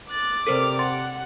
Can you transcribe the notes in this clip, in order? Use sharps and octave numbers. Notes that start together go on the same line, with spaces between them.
D6 F#6 A6
C3 G3 A4 A#4 C5 F6
F#5 C6 A6